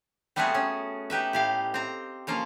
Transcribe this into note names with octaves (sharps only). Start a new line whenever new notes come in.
G3 A3 B3 C4 F#4 G#4
C#4
D#4 G4 B4 E5
A2 G4 F5
C4 A#5
C#3 F3 A#3 F4